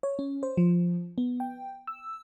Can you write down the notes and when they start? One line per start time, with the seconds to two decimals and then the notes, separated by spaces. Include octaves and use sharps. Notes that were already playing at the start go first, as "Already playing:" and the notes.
0.03 C#5
0.19 C#4
0.43 C5
0.57 F3
1.18 B3
1.40 G5
1.87 E6